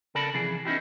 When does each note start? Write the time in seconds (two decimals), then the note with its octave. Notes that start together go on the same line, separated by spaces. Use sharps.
0.15 C#3 A4 A#4 D5 A5 B5
0.34 C3 E3 F3 G#4
0.65 B3 C#4 D#4 E4 G4